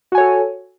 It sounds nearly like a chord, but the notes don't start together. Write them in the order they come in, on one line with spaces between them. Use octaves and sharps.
F#4 G#5 C#5 A4